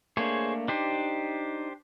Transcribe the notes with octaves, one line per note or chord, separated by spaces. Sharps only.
A3 A#3 D4 G#4 C5 C#5
D4 D#4 G4 C5